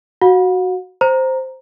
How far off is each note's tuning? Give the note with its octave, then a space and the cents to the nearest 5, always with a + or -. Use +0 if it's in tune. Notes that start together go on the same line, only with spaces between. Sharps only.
F#4 +0 F#5 -45
C5 +0 A#5 +0